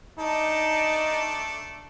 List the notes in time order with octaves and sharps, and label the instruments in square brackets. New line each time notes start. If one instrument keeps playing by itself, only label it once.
[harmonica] A3 D4 A4 [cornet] D#4